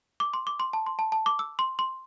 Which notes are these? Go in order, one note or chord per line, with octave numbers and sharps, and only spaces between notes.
D6
C6
D6
C6
A5
C6
A5
A5
D6
E6
C6
C6